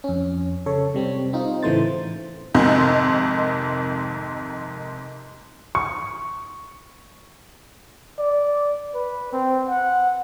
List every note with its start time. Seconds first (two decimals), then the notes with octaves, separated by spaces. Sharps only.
0.04 F2 C#4
0.66 C#3 A4 C#5
0.95 C3 G3 C4
1.33 C4 D#4 F4
1.63 A2 C#3 E3 A3 C5 A6
2.55 F2 G#2 C3 D#3
5.75 C#6
8.19 D5
8.95 B4
9.32 C4
9.69 F#5